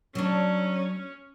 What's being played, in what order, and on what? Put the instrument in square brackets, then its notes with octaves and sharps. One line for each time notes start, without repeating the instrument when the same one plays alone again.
[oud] F#3 D4 [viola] C#4